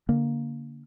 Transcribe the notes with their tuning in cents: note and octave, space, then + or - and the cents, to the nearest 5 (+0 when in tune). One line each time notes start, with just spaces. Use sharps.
D3 -30 A#3 +0